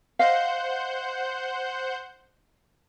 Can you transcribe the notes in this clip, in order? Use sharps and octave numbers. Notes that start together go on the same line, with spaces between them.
C5 D#5 F5 F#5 G6